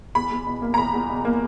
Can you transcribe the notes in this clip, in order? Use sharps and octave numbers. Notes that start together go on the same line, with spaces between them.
E2 B5
E2
B2
A#3
A#5
E2 B5
E2
B2
A#3